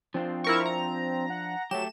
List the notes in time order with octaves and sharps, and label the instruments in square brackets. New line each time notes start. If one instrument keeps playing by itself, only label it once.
[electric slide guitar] F3 D4 F4 [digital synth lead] C4
[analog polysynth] E4 A#4 C#6
A#5
[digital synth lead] F#5
[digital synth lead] F#3 [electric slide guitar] A3 G4 [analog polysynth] E7